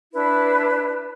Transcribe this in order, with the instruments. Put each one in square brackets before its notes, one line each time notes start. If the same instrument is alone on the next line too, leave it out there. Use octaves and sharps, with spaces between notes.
[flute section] D4 E4 B4